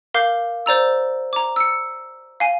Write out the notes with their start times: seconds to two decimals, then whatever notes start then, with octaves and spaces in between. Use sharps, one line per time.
0.14 A#4 F5 D6 G6
0.66 C5 D5 A#5 E6
1.33 A#5 D6
1.56 E6 C#7
2.40 F5 G#5